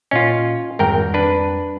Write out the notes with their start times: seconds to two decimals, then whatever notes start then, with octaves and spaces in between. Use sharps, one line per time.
0.11 A#2 C#4 F4 D#5
0.79 G#1 F2 G3 A#4 G5
1.14 D4 B4